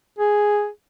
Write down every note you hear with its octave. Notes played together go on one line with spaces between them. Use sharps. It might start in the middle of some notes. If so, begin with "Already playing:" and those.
G#4